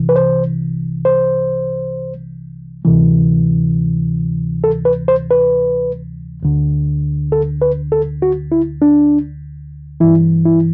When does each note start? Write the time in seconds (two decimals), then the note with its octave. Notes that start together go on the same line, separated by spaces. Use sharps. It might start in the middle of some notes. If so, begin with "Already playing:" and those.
Already playing: C2 C3 E3
0.09 B4
0.16 C5
1.05 C5
2.85 D2 C3 E3
4.64 A4
4.85 B4
5.08 C5
5.30 B4
6.43 D2 D3
7.32 A4
7.62 B4
7.92 A4
8.22 F#4
8.52 E4
8.82 D4
10.00 G2 E3 E4
10.45 E4